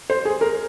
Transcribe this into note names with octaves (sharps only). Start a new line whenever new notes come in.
C5
G#4
A#4